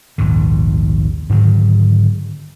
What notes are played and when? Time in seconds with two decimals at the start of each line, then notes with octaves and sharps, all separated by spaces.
0.18 A#1 D#2 G#2 D#3
1.29 G#2 D3 D#3 F#3